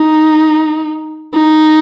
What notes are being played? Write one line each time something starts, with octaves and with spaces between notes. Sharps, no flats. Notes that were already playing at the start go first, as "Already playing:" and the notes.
Already playing: D#4
D#4